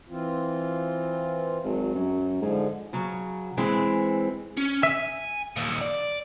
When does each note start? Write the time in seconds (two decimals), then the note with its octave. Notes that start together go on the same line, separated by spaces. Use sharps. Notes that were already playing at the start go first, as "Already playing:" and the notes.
0.09 E3 C4 F4
1.64 G#1 F#3
1.95 F#2
2.41 G#2 D3 F3
2.93 C#3 F#3
3.57 E3 G#3 C4
4.57 C#4
4.83 E5 G#5
5.56 D#2 A#2
5.81 D5